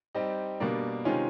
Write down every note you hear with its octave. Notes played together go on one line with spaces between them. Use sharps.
G3 C4 D#4 G4
B2 G3 A#3 D4
C3 D#3 G#3 C#4 F4